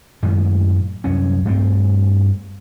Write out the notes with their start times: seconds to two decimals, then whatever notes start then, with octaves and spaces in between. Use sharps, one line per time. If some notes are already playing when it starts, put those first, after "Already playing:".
0.23 F#2 A2 D#3 G#3
1.04 C2 F#2 C#4
1.45 G2 A3 C4